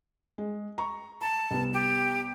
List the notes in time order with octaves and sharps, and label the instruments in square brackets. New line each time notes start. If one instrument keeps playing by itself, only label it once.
[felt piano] G#3
A#5 C#6
[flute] A5 [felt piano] A#5
[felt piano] C2 B3
[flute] G4